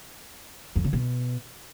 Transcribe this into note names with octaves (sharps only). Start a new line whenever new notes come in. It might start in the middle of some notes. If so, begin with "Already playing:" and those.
F2
C#3
B2